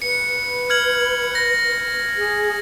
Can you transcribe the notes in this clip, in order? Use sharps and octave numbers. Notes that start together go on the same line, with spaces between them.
B4 C#7
F6 G#6 F#7
A#6
G#4